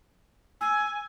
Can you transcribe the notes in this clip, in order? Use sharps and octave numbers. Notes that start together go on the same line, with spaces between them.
G#5 E6